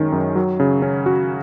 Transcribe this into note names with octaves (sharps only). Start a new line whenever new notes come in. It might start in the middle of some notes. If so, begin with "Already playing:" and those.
Already playing: F#2 D#3 G#3 C#4
F#2
F#3
C#3
C#4
F#4